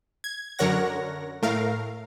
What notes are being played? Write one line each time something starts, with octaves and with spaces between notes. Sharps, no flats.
G#6
F#2 D3 A#4 C#5 F#5 A#6
A2 A3 A#4 F5